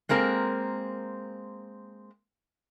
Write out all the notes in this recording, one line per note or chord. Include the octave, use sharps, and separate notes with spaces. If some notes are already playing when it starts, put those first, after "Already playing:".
G#3 A#3 C4 A#4